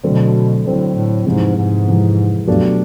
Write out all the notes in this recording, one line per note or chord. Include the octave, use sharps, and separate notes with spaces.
B2 D3 F#3 A3 C4
A2 D3 F#3 A3 C4
A2
F2 G#2 C3 E3 G#3
G#2
F2 C3 E3 G#3
G2 B2 F#3 A3 D4 G4